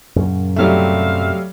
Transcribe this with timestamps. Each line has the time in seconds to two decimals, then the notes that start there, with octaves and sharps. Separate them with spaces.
0.16 F#2 A#2 C#3
0.56 C3 F#3 G3 A3 E5 F5